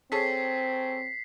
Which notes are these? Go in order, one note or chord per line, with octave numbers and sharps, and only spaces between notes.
C4 G#4 A4 C#5 B6 C7